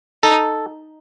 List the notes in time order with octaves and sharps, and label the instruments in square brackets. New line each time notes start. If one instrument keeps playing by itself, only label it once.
[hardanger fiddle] D#4 [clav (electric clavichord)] A4